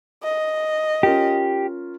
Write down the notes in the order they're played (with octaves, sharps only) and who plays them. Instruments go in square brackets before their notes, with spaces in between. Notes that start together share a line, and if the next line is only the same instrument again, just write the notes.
[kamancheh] D#5
[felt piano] C#4 F4 A#4 [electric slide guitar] G4